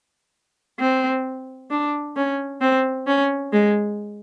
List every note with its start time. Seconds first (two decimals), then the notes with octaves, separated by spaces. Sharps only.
0.80 C4
1.71 D4
2.16 C#4
2.61 C4
3.07 C#4
3.53 G#3